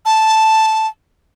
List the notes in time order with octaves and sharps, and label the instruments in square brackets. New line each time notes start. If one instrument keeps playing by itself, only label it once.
[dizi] A5